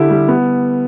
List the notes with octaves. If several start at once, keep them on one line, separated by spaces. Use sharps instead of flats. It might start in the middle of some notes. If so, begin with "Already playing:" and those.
Already playing: D3 E4 G4
G3
B3